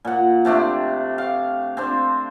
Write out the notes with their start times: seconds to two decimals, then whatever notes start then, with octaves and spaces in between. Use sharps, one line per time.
0.05 A#2 F#5
0.45 C3 A3 D4 G4
1.18 F5
1.77 C4 D4 C5